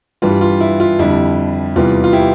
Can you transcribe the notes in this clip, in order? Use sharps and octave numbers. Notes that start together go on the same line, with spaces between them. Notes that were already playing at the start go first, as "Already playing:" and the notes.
G2 E3 G3 F4
F4
E4
F4
F2 D3 G3 E4
E2 C3 E3 G3 F4
F4
E4 G4